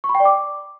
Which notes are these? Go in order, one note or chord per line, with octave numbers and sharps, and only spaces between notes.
C#6
B5
G5
D5
D6